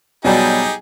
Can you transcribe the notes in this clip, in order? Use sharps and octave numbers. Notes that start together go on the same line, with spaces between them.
B2 F#3 G3 D#4 G4 G#4